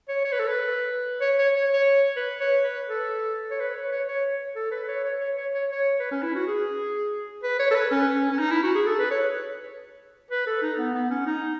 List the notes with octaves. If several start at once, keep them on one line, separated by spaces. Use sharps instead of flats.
C#5
C#5
B4
A4
B4
C#5
C#5
C#5
C#5
B4
C#5
B4
A4
C#5
B4
C#5
C#5
C#5
A4
B4
C#5
C#5
C#5
C#5
C#5
C#5
B4
C#4
E4
F#4
G#4
B4
C#5
A4
B4
C#4
C#4
C#4
D#4
E4
F#4
G#4
A4
B4
C#5
B4
A4
D#4
B3
B3
C#4
D#4